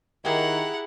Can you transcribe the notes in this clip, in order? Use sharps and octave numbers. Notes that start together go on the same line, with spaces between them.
D#3 E4 G4 G#4 F#5 A#5